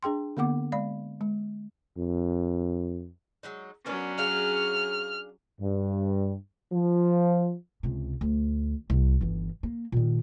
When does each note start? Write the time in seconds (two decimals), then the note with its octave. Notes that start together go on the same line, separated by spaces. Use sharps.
0.03 D4 G#4 G5 C6
0.37 D3 A#3 B3 F#5 D6
0.72 G#3 D5 F5 B5
1.21 G#3
1.98 F2
3.43 F#3 G#3 D#4
3.86 F#3 A#3 B3 C#4 D4
4.18 D4 G#4 F5 F6
5.60 G2
6.73 F3
7.83 C#2 C3
8.21 D2
8.90 C2
9.21 G1 E3
9.63 A#3
9.92 A#2 D#3